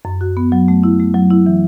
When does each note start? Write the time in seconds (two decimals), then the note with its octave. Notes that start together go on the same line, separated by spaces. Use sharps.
0.05 F#2
0.21 F#4
0.37 B3
0.52 F#3
0.68 A3
0.83 E4
1.00 A3
1.14 F#3
1.30 E4
1.46 E3